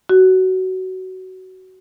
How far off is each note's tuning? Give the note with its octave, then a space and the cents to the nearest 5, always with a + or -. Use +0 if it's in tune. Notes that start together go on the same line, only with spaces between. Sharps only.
F#4 +15